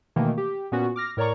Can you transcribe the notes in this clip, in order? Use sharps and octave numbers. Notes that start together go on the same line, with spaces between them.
B2 D#3 E3 A3 A#3
G4
A#2 B3 C#4 F#4
D6 F6 A#6
A2 A#4 C#5 D5 A#5 C#6